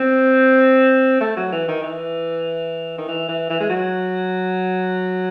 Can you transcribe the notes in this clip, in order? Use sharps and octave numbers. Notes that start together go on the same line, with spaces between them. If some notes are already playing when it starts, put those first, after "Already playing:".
Already playing: C4
A3
F#3
E3
D#3
E3
D#3
E3
E3
E3
G#3
F#3